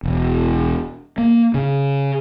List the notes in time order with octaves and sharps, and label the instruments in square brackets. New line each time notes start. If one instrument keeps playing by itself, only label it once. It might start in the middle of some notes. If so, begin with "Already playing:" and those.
[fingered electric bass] E1
A#3
C#3